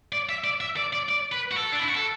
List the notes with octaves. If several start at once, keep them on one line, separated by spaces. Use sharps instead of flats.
D5
E5
D5
E5
D5
D5
D5
B4
F#4
A4
D4
E4
F#4
A4